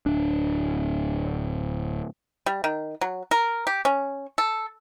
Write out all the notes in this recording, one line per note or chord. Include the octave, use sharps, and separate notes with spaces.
D1 D4
G3
D#3
F#3
A#4
G4
C#4
A4